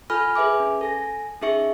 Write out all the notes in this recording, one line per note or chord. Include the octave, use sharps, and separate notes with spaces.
F4 A4 G#5 B5 F6
G#4 B4 E5 G#5 D6
C#4
A4 G#5 A#6
C#4 D#4 G#4 E5 C#6 C#7